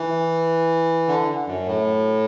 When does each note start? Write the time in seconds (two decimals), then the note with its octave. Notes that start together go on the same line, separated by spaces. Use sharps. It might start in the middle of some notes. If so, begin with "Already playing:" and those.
Already playing: E3
1.08 D3
1.47 F#2
1.66 A2